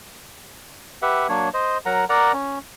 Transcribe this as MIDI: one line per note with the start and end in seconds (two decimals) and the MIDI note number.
1.02 1.27 67
1.02 1.27 71
1.02 1.27 76
1.02 1.27 78
1.29 1.49 54
1.29 1.49 58
1.29 1.49 62
1.29 1.49 73
1.54 1.78 72
1.54 1.78 75
1.86 2.05 54
1.86 2.05 70
1.86 2.05 78
1.86 2.05 82
2.09 2.32 70
2.09 2.32 74
2.09 2.32 78
2.09 2.32 82
2.33 2.59 61